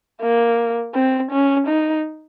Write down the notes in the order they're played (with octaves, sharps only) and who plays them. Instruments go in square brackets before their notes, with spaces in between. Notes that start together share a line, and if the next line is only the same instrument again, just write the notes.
[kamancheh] A#3
C4
C#4
D#4